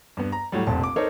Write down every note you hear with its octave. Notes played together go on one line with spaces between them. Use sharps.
G2 B3
A#5
A2 F#3 G3
F1 A#1 C4 A5
D6
D#4 A4 A#4 C5 C#5